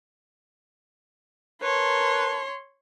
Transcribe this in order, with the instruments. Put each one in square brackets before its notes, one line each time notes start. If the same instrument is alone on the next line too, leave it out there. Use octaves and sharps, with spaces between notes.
[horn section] A#4 B4 A5 [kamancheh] C#5 C6